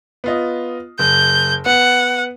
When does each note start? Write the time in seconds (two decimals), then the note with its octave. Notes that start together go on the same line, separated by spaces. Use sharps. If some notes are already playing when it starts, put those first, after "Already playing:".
0.24 B3 F4 D#5
0.99 F#1 G6
1.66 B3 F#5